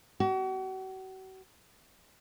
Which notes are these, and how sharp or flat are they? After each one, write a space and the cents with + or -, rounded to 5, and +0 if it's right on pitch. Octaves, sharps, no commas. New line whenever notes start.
F#4 +40